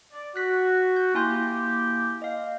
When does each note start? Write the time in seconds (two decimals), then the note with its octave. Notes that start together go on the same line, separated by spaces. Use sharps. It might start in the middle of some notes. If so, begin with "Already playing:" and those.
0.12 D5
0.36 F#4 F#6 B6
0.96 G6
1.15 A#3 E4 G4 G#5 C6
2.22 D#5 F5